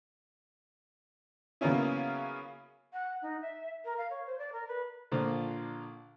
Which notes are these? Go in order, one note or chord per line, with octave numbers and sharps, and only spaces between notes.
C#3 F#3 A#3 B3 C#4 E4
F#5
D#4
E5
A#4
F5
C#5
C5
D5
A#4
B4
A#1 D3 A#3 F4 C5